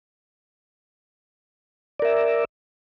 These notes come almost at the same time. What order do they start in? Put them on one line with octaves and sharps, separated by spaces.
D5 A#4 E5